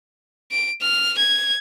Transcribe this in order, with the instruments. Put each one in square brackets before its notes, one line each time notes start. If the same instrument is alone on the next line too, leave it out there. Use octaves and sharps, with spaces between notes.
[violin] D7
F6
G#6